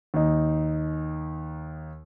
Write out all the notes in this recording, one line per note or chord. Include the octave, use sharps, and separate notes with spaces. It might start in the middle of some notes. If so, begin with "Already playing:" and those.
D#2 D#4